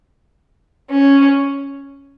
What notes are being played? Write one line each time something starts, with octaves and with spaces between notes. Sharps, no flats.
C#4